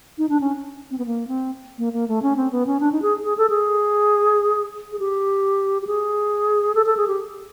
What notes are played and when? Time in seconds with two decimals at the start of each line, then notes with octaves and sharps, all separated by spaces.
0.18 D#4
0.29 D4
0.41 C#4
0.91 C4
0.98 B3
1.06 A#3
1.28 C4
1.78 A#3
1.93 A#3
2.08 A3
2.22 C#4
2.37 C4
2.52 B3
2.66 C#4
2.80 D4
2.92 D#4
3.02 G#4
3.24 G#4
3.38 A4
3.50 G#4
4.92 G#4
4.99 G4
5.82 G4
5.87 G#4
6.75 A4
6.86 A4
6.97 G#4
7.08 G4